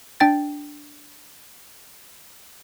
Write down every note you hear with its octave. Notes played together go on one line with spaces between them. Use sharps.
D4 G5 A6